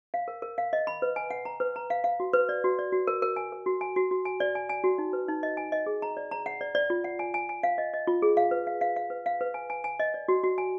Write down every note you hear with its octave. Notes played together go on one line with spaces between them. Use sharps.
F5
A#4
A#4
F5
D#5
B5
B4
G#5
F#5
A#5
B4
A#5
F5
F5
F#4
B4
D5
F#4
D5
F#4
A#4
A#4
G#5
A#4
F#4
G#5
F#4
F#4
G#5
D5
G#5
G#5
F#4
D#4
B4
D#4
D#5
G#5
D#5
G#4
A#5
D5
A#5
F#5
D5
D5
F4
F#5
G#5
G#5
G#5
F5
D#5
D#5
F4
G#4
F5
B4
F5
F5
F5
B4
F5
B4
G#5
G#5
G#5
D#5
D5
F#4
F#4
G#5